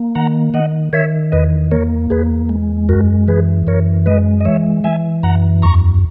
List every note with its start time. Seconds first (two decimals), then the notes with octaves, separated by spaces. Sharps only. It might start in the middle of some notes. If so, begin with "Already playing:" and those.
Already playing: A#3
0.15 D#3 F#5 A#5
0.54 D#3 D#5 F#5
0.93 D#3 C#5 E5
1.32 E2 B4 D#5
1.71 A#3 A#4 C#5
2.10 E2 G#4 B4
2.49 G#3
2.89 F#2 F#4 A#4
3.28 E3 G#4 B4
3.67 F#2 A#4 C#5
4.06 G#3 B4 D#5
4.40 D#5
4.45 E3 C#5 E5
4.84 E3 E5 G#5
5.23 F#2 F#5 A#5
5.62 E2 A#5 C#6